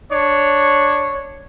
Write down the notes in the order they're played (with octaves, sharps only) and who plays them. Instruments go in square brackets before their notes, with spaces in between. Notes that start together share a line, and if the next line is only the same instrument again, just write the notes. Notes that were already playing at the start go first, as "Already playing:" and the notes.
[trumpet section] D4 C#5